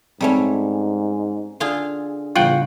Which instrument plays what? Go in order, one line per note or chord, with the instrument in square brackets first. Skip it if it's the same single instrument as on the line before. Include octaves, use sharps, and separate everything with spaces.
[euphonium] G#2 [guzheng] G3 A3 C#4 [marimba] C4
[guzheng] D3 F4 G#4
[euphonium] E2 [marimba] A2 C#3 G3 [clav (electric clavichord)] F4 F#5 G5 [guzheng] F#4